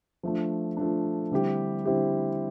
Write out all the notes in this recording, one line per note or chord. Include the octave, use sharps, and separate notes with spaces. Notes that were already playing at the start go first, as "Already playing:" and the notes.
F3 A3 D4
F3 A3 D4
D3 G3 C4 E4 G4
D3 G3 C4 E4 G4